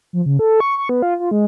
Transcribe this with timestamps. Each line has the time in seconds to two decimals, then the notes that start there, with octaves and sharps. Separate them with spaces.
0.13 F3
0.26 C#3
0.39 A4
0.60 C#6
0.78 C#6
0.89 B3
1.02 F4
1.20 F4
1.31 G#3